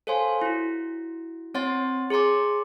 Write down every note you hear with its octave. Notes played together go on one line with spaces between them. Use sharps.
A4 C5 C#5 F5 G#5 C6
E4 F#4
C4 C#5 F#5 C6 A6
G#4 C#5 A#5 C6 D6